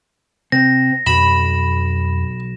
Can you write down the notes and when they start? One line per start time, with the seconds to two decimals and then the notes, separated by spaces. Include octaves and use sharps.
0.52 C3 C4 A#6
1.06 B1 F2 B5 E7